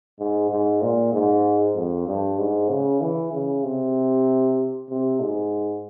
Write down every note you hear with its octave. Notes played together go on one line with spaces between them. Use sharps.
G#2
G#2
A#2
G#2
F2
G2
G#2
C#3
E3
C#3
C3
C3
G#2